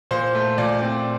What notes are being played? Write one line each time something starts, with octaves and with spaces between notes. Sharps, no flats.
A#2 C5
A3
A#2 D5
C4